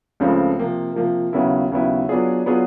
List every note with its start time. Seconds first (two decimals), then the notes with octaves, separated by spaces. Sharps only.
0.20 C#2 C#3 F3 A3 C4
0.59 C3 F3 A#3
0.96 C3 F3 A#3
1.33 D#2 C#3 F#3 B3 E4
1.72 D#2 C#3 F#3 B3 E4
2.09 F#3 B3 D4 F4 G#4
2.46 F#3 B3 D4 F4 G#4